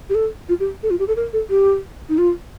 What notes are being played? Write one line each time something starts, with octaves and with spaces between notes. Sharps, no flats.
G4
A4
F4
G4
A4
F4
G4
A4
A#4
A4
G4
D#4
F4